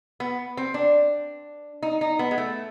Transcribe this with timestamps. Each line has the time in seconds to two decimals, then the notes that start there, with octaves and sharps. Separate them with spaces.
0.20 B3
0.57 C4
0.74 D4
1.82 D#4
2.01 D#4
2.19 B3
2.31 G#3
2.38 A3